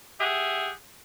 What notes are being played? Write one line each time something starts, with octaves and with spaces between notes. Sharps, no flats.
G4 G#4 E5 F#5